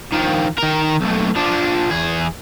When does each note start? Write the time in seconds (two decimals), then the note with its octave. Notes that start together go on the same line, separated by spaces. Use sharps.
0.12 D#3 F3
0.58 D#3 A#4
1.01 B1 A2
1.36 F3 D4
1.90 E2 G#4